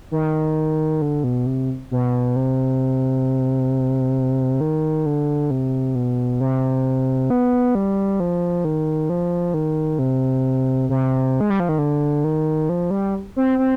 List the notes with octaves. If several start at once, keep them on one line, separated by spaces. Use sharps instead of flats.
D#3
D3
B2
C3
B2
C3
D#3
D3
C3
B2
C3
B3
G3
F3
D#3
F3
D#3
C3
C3
G#3
G3
F3
D#3
D3
D#3
F3
G3
C4
C4